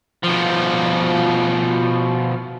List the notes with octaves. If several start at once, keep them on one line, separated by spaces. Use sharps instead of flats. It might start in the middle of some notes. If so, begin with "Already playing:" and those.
B2 F3